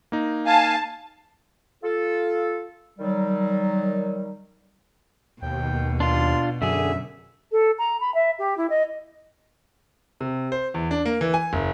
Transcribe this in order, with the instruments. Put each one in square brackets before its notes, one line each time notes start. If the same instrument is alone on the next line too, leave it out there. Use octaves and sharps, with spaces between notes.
[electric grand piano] A#3 D#4
[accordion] F5 G#5 [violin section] A5
[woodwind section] F4 A4
D#3 F#3 G3
[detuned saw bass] D#2 [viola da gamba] B2 [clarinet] G5
[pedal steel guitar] D4 F4 [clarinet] C6
[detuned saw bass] F#2 [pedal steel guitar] D3 G#4 [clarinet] E5
[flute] A4
A#5
B5
E5
G4
E4
D#5
[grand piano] C3
C5
E2
D4
A#3
E3
G#5
F#1